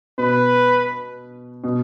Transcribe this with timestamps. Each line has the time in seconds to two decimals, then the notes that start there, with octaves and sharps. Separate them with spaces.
0.18 B2 B4
1.64 B2